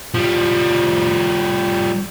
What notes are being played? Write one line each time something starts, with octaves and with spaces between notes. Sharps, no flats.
F3 G3